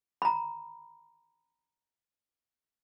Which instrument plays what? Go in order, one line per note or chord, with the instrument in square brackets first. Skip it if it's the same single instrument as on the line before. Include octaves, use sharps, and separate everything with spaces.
[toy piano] A#5 B5